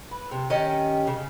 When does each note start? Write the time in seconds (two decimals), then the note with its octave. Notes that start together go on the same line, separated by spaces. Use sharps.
0.11 B4
0.31 C3
0.50 D#3 C#4 G4 D#5
1.07 C#3